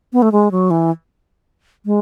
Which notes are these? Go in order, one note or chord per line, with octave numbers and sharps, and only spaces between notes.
B3
A3
G#3
F#3
E3
G#3